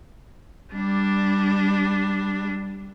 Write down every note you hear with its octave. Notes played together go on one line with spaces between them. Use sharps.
G3 D4